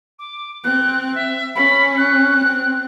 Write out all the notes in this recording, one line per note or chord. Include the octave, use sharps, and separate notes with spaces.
D6
C4 F#6
E5
C#4 B5
F#6
C4